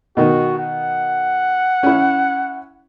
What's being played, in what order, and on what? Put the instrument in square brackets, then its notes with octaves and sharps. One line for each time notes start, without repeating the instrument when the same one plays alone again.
[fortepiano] B2 D#3 [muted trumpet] F#4
[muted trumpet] F#5
[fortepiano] C#4 E4